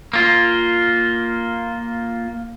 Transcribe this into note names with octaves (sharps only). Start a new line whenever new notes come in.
A#3 F4